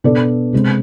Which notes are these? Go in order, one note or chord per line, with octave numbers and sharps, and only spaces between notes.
B2 B3 D4 A4 D5
C3 G#3 C4